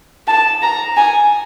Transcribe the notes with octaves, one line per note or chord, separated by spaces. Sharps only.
A5
A#5
G#5